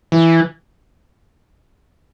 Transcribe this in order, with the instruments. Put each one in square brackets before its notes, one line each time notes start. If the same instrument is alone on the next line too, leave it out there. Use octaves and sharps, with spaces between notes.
[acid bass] E3